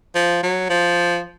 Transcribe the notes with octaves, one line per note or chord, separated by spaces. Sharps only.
F3
F#3
F3